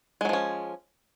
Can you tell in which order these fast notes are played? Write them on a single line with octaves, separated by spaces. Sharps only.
G#3 F#3 F3 C#4